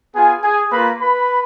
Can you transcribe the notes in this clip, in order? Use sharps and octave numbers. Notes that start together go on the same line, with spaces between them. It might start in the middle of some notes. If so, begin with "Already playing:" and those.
B3 F4 G#4 G#5
G#4 G#5
A#3 F4 B4 B5
B4 B5